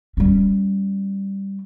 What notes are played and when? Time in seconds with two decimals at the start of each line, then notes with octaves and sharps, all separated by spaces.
0.17 G3 C#4